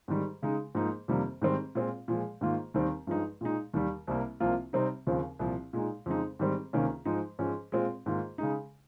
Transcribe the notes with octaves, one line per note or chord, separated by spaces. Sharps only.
G#2 D#3 G3
C#3 G#3 D#4
G#2 F3 A#3 D#4
F2 C3 D#3 G3 A#3
G#2 D#3 G3 C4
A#2 G#3 C4 F4
A#2 F3 G#3
G#2 D#3 A#3 F4
D#2 D#3 G3 C4
G2 F3 G#3 D#4
A#2 G#3 D#4
D#2 D#3 G3
C2 C3 G3 A#3
C2 C3 F3 A#3 F4
C3 G3 C4 D#4
D#2 C#3 F3 C4
C2 A#2 F3
A#2 G#3 D#4
F2 C#3 G#3 D#4
G#2 D#3 G3 C4
C#2 C3 D#3 A#3 C#4
G#2 F3 G#3 D#4
G#2 F3 G#3 C#4
A#2 G#3 C4 F4
G#2 D#3 A#3 F4
C#3 G#3 D#4